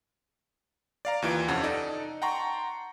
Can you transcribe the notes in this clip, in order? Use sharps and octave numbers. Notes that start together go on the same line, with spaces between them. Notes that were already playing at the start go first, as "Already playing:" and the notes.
D5 F5 A#5
D#2 E3 F4 D7
F2 C3 C#4 F#5 F#6
D#4 A4 D5
F#5 G5 A5 A#5 C6 C#6